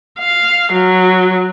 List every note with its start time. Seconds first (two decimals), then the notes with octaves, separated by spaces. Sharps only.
0.19 F5
0.72 F#3